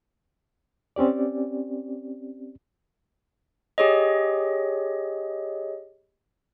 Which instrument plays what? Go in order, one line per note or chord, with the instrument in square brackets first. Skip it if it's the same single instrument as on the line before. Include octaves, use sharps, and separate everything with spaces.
[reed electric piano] C4 C#4 G4 D5
[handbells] G4 G#4 C#5 D#5